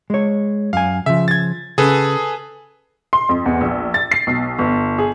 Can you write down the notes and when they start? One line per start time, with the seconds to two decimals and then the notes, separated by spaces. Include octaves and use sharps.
0.10 G#3 C#5
0.73 F#2 F5 G#5
1.06 C#3 F3 E5
1.28 G#6 A6
1.78 C#3 C#4 G#4 A4 B4
3.13 C6
3.29 F2
3.46 E2
3.61 A#1
3.94 A6
4.12 C7
4.27 B1
4.59 G1
4.98 G#4